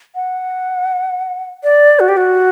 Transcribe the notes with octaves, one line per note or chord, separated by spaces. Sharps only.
F#5
D5
F#4
G4
F#4